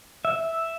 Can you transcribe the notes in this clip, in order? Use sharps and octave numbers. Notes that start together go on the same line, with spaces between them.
E5